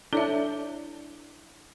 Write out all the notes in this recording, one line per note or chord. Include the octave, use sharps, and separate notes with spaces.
D4 E4 A4 C#5 E5